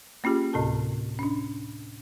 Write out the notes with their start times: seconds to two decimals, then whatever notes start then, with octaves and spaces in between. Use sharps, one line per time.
0.24 A#3 C#4 F4 G4 G#4
0.53 D2 A2 C3 A4 A5
1.19 C#4 D4